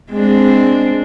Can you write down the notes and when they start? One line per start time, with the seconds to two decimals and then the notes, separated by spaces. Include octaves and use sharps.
0.11 G#3 C4 D4